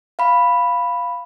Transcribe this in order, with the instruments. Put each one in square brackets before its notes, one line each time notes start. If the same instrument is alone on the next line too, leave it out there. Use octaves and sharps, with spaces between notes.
[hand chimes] F5 B5